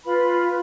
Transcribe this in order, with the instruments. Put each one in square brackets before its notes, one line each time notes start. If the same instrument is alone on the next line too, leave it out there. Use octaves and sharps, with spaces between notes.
[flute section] F4 B4 B5